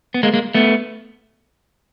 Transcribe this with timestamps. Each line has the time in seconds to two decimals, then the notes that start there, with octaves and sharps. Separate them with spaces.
0.14 B3
0.23 G#3 A#3
0.34 G#3 A#3
0.55 A3 B3